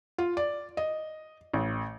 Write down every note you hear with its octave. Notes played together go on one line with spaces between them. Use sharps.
F4
D5
D#5
A1